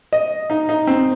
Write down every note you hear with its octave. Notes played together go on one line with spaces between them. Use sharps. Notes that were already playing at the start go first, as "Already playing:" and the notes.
D#5
D#4
D#4
C4